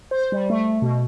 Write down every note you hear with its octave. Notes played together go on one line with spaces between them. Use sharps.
C5
G3
A3
B2